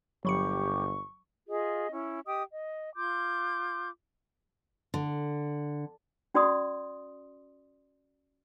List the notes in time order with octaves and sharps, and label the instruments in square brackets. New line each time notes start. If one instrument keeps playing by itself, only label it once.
[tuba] G1 [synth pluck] F#3 B5 C#7 [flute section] G4 G5 D6 [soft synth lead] C#6
[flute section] F4 G#4 D#5
C#4 E4
G4 D#5 G5 D#6
D#5
F4 C6 D6 G6
[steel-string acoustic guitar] D3
[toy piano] C#4 F#4 D5 C6 D#6